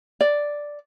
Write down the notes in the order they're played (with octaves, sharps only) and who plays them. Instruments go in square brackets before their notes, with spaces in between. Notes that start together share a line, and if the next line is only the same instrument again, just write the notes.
[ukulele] D5